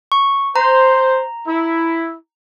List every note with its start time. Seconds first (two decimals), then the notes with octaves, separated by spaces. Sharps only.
0.12 C#6
0.56 C5 A#5
1.46 E4